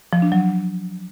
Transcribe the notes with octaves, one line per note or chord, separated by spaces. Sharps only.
F3
D4
F#3